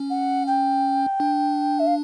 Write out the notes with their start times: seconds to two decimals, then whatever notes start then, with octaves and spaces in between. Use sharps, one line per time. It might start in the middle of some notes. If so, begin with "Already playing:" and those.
Already playing: C#4
0.10 F#5
0.47 G5
1.20 D4
1.79 E5
1.87 F5